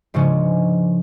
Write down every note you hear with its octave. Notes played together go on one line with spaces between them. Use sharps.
G#2 C#3 F3 G#3 C#4 D4